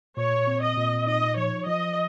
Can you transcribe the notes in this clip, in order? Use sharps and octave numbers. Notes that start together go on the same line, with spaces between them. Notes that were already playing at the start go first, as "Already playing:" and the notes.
A#2 C#5
C4
D#5
A#2
D#4 D#5
F3 C#5
F3 D#5